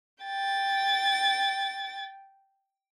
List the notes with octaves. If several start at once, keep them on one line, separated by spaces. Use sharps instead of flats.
G5 A6